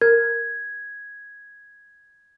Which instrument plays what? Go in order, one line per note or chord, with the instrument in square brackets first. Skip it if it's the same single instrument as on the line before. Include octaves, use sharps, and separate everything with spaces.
[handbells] A#4 [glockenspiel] G#6